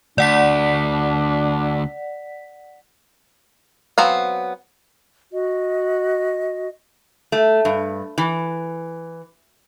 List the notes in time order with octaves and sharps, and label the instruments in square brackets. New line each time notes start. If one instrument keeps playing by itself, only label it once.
[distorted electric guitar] D2 [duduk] D4 [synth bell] D5 F#5 B6
[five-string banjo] F#3 B3 C4 F5
[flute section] F#4 D#5
[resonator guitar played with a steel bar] A3
G2
E3